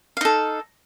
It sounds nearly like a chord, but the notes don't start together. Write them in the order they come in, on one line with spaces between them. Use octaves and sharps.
F5 D#4 A4